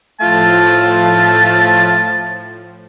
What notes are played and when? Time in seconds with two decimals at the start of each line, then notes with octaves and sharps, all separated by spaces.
0.20 A2 F3 A3 F4 A5